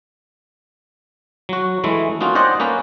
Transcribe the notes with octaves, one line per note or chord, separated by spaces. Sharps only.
F#3 F#4
E3 G#3 A3 E4
A#3 C#4 D#4 F4 F#4
C5 D5 D#5 F#5 G5
A#3 C#4 B4